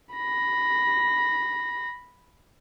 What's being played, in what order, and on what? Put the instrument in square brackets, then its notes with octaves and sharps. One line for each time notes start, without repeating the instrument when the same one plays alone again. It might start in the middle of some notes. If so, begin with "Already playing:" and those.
[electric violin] B5 A#6